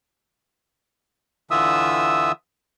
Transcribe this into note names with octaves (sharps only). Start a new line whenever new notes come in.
D3 E3 F4 E5 D#6 E6